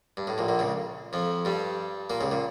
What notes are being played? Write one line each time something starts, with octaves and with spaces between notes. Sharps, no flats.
G2
A2
A#1 A#2
A#1 A#2
C#2 C#3
F2 F3
G2 G3
A#2 A#3
C#2 C#3
A#2